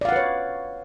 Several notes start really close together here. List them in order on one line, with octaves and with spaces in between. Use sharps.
D5 F5 F#5 B4 C#5